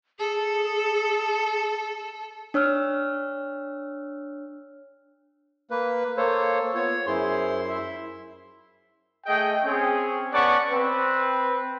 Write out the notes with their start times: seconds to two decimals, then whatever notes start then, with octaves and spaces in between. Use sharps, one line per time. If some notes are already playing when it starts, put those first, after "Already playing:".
0.19 G#4 A4
2.54 D4 C#5 E6 F6
5.70 A#3 B4
6.17 A#3 A4 C5 C#5
6.75 B3 F4 C5 C#5
7.07 F#2 E4 G#4 C5 C6
7.69 E4 E5
9.26 A3 G#4 D#5 G5
9.64 C4 C#4 G#4
10.32 B3 C#4 D5 F#5 A5 C#6
10.71 C4 B4